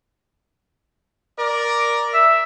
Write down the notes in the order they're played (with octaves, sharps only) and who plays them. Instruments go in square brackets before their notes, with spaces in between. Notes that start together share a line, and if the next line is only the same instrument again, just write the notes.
[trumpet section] A#4 D5
[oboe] E5